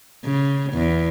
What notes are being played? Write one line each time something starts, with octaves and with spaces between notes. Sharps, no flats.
C#3
E2